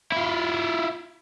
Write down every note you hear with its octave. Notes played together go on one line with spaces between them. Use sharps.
E4 F4